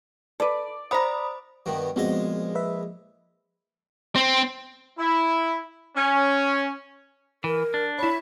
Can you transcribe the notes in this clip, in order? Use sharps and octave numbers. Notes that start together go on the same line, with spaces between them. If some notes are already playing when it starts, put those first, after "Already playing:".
A4 B4 D5
C5 F#5 A#5 B5 D#6
G2 B2 D#3
A#1 G#3 B3 C4 F#4 D#5
B4 E5
C4
E4
C#4
E3 A#4
D4
E4 C#5 B5